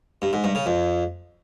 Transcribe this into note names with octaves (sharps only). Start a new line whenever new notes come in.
G2
G#2
G2
C#3
F2